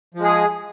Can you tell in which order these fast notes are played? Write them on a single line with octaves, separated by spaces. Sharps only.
F3 G#3 G#4